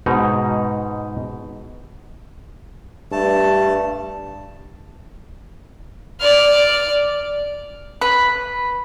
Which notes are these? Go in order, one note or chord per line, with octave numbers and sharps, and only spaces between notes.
G#2 B2 D#4
G2 A3 A5
D5 F6
B4 B5